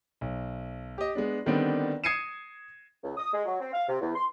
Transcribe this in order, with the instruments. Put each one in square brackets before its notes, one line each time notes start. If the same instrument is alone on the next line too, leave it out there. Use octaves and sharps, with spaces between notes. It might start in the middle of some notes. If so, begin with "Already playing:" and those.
[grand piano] B1
G4 D#5
G#3 B3 D4
D3 D#3 G3 B3 C4 D4
D#6 G#6 C7 C#7 D#7 E7
[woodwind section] C#2
D#6
G#3
F#3
C4
F5
C3
E2
C6